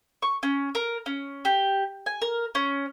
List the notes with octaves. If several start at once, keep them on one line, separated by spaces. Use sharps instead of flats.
C#6
C#4
A#4
C#4
G4
G#5
A#4
C#4